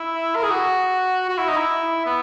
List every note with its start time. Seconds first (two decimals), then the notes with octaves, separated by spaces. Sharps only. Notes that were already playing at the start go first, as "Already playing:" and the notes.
Already playing: E4
0.36 A#4
0.43 G#4
0.51 F#4
1.29 F#4
1.38 E4
1.48 D#4
1.57 E4
2.06 B3